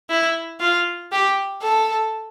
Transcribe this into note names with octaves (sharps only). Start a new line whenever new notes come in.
E4
F4
G4
A4